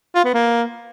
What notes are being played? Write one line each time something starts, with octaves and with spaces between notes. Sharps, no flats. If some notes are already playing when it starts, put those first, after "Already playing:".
F4
B3
A#3